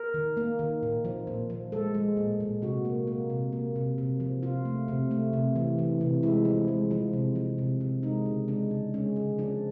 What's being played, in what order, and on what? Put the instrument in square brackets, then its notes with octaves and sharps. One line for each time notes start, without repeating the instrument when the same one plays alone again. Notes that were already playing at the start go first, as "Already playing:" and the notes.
Already playing: [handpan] A#4
D#3
A#3
D#3
A#2
F3
A#2
F3
G#3 A4
G#3
A#2
A#2
C3 F#4
A#3
A#3
C3
A#3
C3
C3
F3
C3 F4
A3
C3
A3
C3
E3
E3
C3
G#3 E4
F3
G#3
F3
C3
F3
C3
C3
G#3 D#4
C#3
G#3 D4
C#3
G#3 C#4
C#3
F3 D4